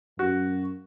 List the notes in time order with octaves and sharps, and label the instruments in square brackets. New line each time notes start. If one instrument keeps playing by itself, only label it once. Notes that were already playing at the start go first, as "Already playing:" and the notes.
[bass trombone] F#2 [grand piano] F#4